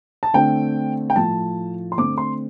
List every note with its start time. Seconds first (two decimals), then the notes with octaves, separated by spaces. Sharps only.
0.23 A5
0.34 D3 A3 C4 G5
1.10 G5
1.15 A2 F3 A3 A5
1.92 C6
1.97 D3 A3 C4 D6
2.18 C6